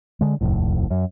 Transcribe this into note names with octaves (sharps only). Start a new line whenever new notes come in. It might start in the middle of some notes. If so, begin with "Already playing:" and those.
D3 G#3
D#1 C2 F2 A2
F#2